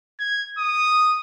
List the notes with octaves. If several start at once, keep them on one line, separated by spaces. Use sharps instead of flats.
G#6
D#6